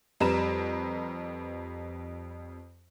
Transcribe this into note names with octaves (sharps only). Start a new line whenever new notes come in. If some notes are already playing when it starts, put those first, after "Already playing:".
F2 G3 B4 A#5 E7